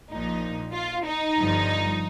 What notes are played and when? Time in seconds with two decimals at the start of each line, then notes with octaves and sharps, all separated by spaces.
0.10 A#1 A#2 F3 D#4
0.74 F4
1.06 D#4
1.38 G1 G2 F3